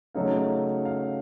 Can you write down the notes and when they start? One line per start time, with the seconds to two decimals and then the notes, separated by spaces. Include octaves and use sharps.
0.15 C#3 F#3 A3 D#4 F5
0.85 F5